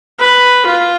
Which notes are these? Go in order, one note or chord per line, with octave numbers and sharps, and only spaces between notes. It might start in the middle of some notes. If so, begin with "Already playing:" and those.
B4
F4